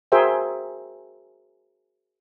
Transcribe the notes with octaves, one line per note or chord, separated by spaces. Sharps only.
F#4 G#4 A#4 C5 E5 G5